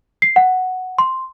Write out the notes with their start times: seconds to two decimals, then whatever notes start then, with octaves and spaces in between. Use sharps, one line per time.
0.22 C7
0.36 F#5
0.98 C6